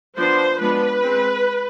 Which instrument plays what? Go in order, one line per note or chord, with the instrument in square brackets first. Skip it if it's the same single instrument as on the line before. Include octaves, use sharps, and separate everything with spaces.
[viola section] F3 B3 D4 C5
F3 G#3 B3 D4 B4
G#3 C4